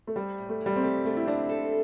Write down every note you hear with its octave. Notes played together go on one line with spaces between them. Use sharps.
A3
G3 C4
A2
A3
E3
G3
C4
A3 G4
D3 A3
E4
C4 D4
A4